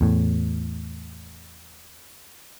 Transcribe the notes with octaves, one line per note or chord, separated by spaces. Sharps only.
E2 A2